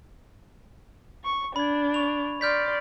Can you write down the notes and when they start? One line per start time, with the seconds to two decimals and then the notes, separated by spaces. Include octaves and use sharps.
1.24 C#6
1.56 D4 B5 G#6
1.94 C#6 F7
2.41 D5 C6 F6 G6 B6